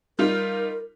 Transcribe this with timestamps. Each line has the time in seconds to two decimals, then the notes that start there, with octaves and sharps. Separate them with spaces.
0.19 G3 D#4 F4 A#4